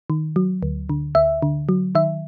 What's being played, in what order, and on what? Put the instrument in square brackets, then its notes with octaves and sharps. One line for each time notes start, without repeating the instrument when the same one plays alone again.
[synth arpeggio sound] D#3
F#3
D2
D3
D2 E5
D3
F#3
D#3 E5